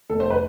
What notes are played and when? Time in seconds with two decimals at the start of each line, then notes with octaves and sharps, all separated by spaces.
0.09 F1 A4
0.20 C5
0.30 B4